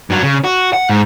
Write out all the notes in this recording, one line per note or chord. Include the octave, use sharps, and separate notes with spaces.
G2 F#3
C#3
F#4
F#5
G#2